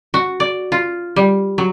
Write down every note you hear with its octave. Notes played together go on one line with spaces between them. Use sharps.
F#4
D5
F4
G3
F#3